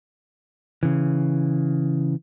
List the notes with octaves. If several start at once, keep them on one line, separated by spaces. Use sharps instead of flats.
C#3 E3